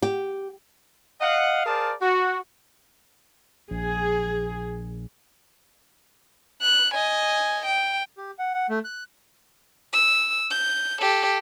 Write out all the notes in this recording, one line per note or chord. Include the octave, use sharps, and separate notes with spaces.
G4
D#5 F5 F#5
G#4 A#4 C5 D5 F5 A5
F#4
A#1 G#4
F#6
D#5 G#5
G5
G4
F#5
F#5
A3
F#6
E6
G6
G4 A4